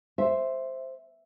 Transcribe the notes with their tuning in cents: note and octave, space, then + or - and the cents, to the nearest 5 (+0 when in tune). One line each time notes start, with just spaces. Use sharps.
C5 +0 E5 +0